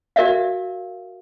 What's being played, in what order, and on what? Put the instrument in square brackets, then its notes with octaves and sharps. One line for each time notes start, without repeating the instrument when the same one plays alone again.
[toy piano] F#4 A#4 D5 E5 F5